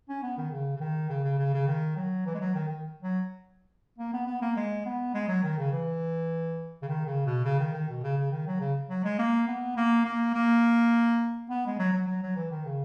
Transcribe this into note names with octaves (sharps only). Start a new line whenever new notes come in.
C#4
B3
D#3
C#3
C#3
D#3
C#3
C#3
C#3
C#3
D#3
F#3
E3
G#3
F#3
D#3
D#3
F#3
A#3
B3
B3
A#3
G#3
B3
G#3
F#3
D#3
C#3
E3
C#3
D#3
C#3
B2
C#3
D#3
D#3
B2
C#3
C#3
D#3
F#3
C#3
F#3
G#3
A#3
B3
A#3
A#3
A#3
B3
G#3
F#3
F#3
F#3
F#3
E3
D#3
C#3